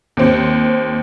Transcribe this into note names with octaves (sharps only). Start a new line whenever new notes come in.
D#2 C4